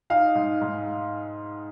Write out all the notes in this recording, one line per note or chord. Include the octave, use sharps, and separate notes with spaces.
D#4 F5
G#2
G#2